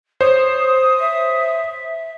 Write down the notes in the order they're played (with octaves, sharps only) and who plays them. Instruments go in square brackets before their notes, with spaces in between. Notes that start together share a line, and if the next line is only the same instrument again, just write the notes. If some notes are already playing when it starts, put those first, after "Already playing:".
[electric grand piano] C5 C#5 [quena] D#6
[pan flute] E5